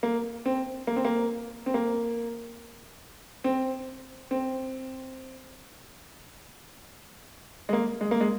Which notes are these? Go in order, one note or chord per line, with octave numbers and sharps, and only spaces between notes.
A#3
C4
A#3
C4
A#3
C4
A#3
C4
C4
G#3
A#3
G#3
A#3
G#3